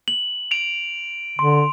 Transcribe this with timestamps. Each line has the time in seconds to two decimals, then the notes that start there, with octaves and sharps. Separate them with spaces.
0.08 F#7
0.51 D7 F7
1.39 D3 C6